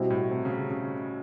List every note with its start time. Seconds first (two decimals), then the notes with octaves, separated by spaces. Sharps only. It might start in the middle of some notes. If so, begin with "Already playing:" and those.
Already playing: B2 G3 C4 E4
0.10 A2
0.31 C3
0.45 C#3
0.51 C3
0.71 C#3